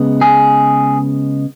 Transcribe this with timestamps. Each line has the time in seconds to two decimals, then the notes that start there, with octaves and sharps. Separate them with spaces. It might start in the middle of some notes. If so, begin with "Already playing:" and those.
Already playing: C#3 G#3 B3
0.21 G#4